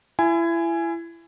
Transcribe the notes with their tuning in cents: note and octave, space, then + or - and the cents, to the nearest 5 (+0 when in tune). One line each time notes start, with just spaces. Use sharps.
E4 +30 G#5 +0